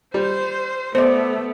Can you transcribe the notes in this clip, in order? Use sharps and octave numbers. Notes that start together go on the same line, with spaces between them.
G3 C5
A3 B3 C5 D5